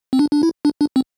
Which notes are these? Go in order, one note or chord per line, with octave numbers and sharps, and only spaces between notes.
C4
D4
D4
E4
D4
D4
C4